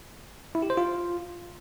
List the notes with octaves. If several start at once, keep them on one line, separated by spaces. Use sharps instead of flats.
E4
G4
C5
F4